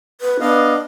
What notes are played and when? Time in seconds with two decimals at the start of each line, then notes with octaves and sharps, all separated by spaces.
0.21 B4
0.40 B3 D4 D#5 F5